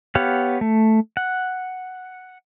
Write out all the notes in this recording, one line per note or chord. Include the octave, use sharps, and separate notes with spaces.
B3 G4 C#5 F5 F#5
A3
F#5